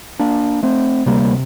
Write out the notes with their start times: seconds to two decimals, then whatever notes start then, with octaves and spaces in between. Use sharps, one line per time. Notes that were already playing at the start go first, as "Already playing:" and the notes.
0.19 A#3 D4
0.63 A3 C4
1.06 D2 C3 G3 A#3